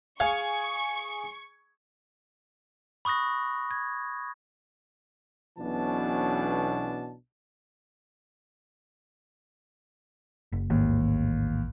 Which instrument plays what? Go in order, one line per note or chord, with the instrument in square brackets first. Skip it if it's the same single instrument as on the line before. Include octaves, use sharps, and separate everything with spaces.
[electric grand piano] G#4 G#5 G#6 [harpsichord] F5 [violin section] C#6
[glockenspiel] B5 C#6 D#6 F#6 A#6
G#6
[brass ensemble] B1 B2 E3 C#4 D4 A5
[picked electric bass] F#1
[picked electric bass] A1 G#2 [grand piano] D#2